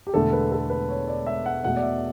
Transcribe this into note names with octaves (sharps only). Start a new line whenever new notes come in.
G4
E1 E2 D3 A3 A4
B4
A4
B4
C#5
D5
E5
F#5
E2 B2 A3 F#5
D5
E5